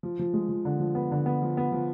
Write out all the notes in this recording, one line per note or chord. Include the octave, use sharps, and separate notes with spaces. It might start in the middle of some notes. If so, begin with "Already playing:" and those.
F3
F3
G#3
F3
D3
F3
B3
D3
B3
F3
B3
F3